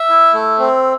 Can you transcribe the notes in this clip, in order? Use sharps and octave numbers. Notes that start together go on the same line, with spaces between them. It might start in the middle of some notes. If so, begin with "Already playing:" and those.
Already playing: E5 E6
E4
A3
C4